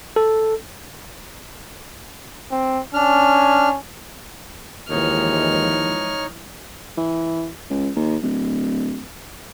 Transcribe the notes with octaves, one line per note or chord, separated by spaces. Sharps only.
A4
C4
C#4 D4 F6
D#2 E3 F3 G#3 D#4 C#5 F6
E3
C#2
D#2
D1